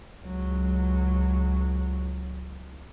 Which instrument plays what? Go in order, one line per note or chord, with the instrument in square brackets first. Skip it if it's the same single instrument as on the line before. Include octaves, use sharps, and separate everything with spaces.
[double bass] C#2 F#3